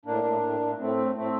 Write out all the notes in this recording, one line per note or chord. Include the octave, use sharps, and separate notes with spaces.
A2 A#3 D4
A2
A2
A2
A2 A3 C4
A2
A2 A3 C4